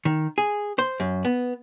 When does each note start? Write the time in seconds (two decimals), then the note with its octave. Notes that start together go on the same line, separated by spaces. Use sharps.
0.05 D#3
0.38 G#4
0.79 C5
1.00 F#2
1.25 B3